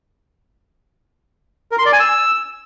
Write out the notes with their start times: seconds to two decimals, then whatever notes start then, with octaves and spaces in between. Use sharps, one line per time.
1.72 A#4
1.79 C6
1.86 D5
1.93 G#5
2.00 E6